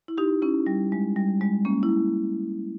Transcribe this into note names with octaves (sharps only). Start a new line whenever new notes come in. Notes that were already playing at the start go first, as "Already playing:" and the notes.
E4
D#4 G4
C#4 E4
G3
G#3
G3
G#3
A#3 C#4
E4